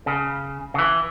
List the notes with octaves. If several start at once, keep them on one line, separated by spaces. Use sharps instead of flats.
C#3
C#3
E3